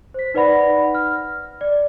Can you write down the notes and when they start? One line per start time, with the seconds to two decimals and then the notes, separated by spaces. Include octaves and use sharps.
0.14 C5 B6
0.34 D#4 B4 D5 F#5 B5 A#6
0.94 F6
1.61 D5